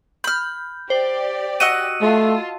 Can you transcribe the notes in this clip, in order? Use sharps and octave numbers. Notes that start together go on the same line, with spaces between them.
B5 F6 G6
G4 C5 D5
F#4 D#5 F#5 E6 D#7
A3 F4 A5